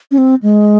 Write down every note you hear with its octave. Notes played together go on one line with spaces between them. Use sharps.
C#4
C4
G#3